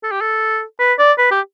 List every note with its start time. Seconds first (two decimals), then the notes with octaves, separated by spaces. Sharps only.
0.03 A4
0.11 G4
0.21 A4
0.80 B4
0.99 D5
1.18 B4
1.31 G4